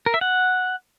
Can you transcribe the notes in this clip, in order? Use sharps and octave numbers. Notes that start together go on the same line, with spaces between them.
A#4
E5
F#5